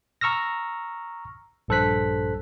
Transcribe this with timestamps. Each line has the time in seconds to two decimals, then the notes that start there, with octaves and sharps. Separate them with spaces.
0.21 A#5 C#6 E6 F6 A#6
1.68 A#1 G2 A4 C5 F#6 B6